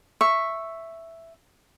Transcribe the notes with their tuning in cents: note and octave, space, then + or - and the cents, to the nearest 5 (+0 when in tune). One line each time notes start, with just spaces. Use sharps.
E5 +5 C#6 -5